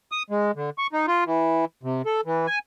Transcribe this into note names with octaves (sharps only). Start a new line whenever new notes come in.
D#6
G#3
D3
C#6
D#4
F4
E3
C3
A4
E3
G#5